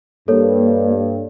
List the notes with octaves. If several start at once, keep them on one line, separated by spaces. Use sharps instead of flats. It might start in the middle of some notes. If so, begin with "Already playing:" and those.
G2 A#3 A4 C#5